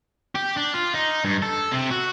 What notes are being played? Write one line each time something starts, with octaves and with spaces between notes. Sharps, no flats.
G4
D4
F4
D#4
G2
A4
C3
F#4